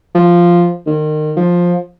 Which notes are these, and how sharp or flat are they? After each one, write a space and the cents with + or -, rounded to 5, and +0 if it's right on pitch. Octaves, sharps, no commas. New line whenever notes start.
F3 -5
D#3 -30
F3 +10